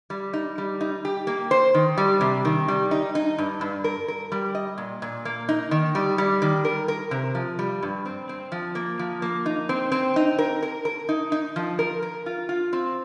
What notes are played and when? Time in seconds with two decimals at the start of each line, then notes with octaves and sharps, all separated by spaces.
0.10 G3
0.33 D#4
0.58 G3
0.81 D#4
1.05 G4
1.27 A#3
1.51 C5
1.74 D#3
1.98 G3
2.21 C3
2.45 D#3
2.68 G3
2.91 D#4
3.15 D#4
3.38 G2
3.61 G2
3.84 A#4
4.08 A#4
4.32 G3
4.55 D#5
4.78 A#2
5.02 A#2
5.25 A#3
5.49 D#4
5.71 D#3
5.95 G3
6.18 G3
6.42 D#3
6.65 A#4
6.88 A#4
7.11 C3
7.35 F3
7.59 G3
7.83 G2
8.05 C4
8.29 C4
8.52 F3
8.75 A#3
8.99 F3
9.22 A#3
9.46 D#4
9.69 C4
9.92 C4
10.16 D#4
10.38 A#4
10.63 A#4
10.85 A#4
11.09 D#4
11.32 D#4
11.56 F3
11.79 A#4
12.02 A#4
12.26 F4
12.49 F4
12.73 C4